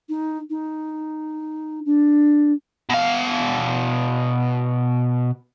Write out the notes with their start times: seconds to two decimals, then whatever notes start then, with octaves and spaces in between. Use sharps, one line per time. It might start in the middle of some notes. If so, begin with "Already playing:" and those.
0.09 D#4
0.50 D#4
1.85 D4
2.89 B2 F5